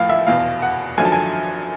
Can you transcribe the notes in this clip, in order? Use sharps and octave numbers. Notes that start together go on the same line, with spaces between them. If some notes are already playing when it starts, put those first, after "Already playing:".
Already playing: A1 A2 F3 F5
E5
F1 E2 B2 F5
F#5
G#1 F#2 D3 F3 G#5
A5
G#5